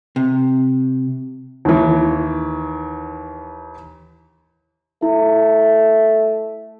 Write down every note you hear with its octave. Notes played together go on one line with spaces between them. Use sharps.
C3
D#2 E3
A3 E4